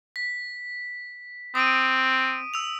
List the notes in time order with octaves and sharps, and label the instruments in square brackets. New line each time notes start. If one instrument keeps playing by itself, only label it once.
[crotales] B6
[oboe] C4 [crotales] D#6 D7 D#7
[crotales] E6 F7